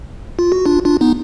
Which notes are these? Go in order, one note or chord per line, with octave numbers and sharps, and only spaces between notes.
F4
F#4
D4 F4
D4 F4
B3 D#4